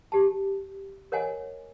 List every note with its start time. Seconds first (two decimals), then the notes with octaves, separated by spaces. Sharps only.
0.12 G4 A5
1.12 A#4 C#5 D#5 F#5 G#5